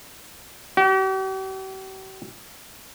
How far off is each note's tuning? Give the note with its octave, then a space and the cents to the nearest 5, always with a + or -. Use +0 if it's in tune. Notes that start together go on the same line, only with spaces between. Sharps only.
G4 -45